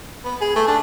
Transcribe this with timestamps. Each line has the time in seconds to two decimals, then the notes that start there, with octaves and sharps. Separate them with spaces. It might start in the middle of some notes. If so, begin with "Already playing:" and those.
0.25 B3
0.41 G#4
0.56 A3
0.68 D4